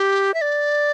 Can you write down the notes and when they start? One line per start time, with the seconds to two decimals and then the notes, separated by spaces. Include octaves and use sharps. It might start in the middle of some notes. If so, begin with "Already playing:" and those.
Already playing: G4
0.34 E5
0.41 D5